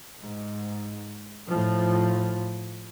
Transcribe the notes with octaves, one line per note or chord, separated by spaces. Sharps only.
G#2
A2 F3